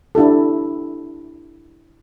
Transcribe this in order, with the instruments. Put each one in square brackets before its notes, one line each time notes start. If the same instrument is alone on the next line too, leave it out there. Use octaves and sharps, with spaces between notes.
[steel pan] D4 E4 G4 A4